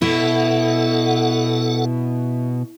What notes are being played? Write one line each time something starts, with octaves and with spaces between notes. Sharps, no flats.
B2 E4 A4 F#5